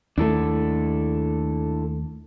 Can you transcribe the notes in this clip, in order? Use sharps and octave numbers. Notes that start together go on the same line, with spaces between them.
D#2 A3 D4 E4 A4